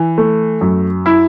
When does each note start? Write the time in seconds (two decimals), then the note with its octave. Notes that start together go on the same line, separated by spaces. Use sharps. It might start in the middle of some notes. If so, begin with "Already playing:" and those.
Already playing: E3
0.18 A3
0.61 F#2
1.06 E4